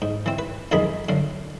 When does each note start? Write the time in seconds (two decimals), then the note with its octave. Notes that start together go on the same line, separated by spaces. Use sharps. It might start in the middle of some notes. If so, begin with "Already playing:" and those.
0.02 G#2
0.26 E3 C4
0.39 B4
0.71 B1 F2 D#3 G#3 G#4 B5
1.09 F#2 D3 F5